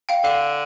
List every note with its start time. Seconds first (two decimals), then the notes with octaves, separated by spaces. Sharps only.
0.09 F5 G5
0.24 D3 F5